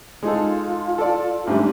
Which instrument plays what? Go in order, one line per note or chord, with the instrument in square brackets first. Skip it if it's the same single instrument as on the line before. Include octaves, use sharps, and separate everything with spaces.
[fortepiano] G#3 D#4 A4 [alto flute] F4
[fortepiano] A4 D5
[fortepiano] A1 G#2 G3 [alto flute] D4